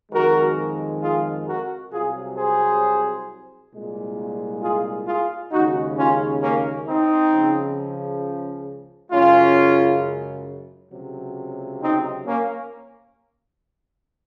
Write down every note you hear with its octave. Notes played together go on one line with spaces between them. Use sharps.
F2 D#3 G#3 F#4 A#4
F4 G#4
F#4 A#4
C2 C3 F#3 F4 G#4
G#4 C5
C2 A#2 G#3
F4 G#4
F4 G#4
D#2 C#3 G#3 D#4 F#4
C#4 F4
A#3 C#4
C4 D#4
C#2 C#3 F3
F#2 C#3 G#3 C#4 F4
C#2 C3 F#3
C4 D#4
A#3 C#4